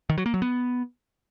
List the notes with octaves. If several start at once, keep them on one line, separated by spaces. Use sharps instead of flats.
D#3
F#3
A#3
F#3
B3